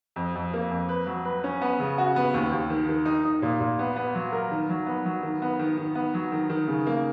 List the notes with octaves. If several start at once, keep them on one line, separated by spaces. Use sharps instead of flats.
F2
F2
A#3
F2
B4
F#3
B4
C#4
B3
C#3
F#4
B3
D#2
D#2
D#3
D#3
D#4
D#4
A#2
A#2
B3
B3
F#3
A#4
D#3
F#3
B3
F#3
D#3
B3
D#3
D#3
B3
F#3
D#3
D#3
C#3
A#3